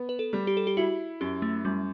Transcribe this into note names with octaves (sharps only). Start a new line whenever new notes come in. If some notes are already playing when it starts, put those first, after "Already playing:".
Already playing: B3
B4
A4
G3
G4
A4
G4
E4 F#4
F#2 G4
A3
F#2 G3